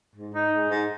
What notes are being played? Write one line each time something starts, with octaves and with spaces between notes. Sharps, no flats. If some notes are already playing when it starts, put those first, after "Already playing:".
G#2
D#4
G#3
G#2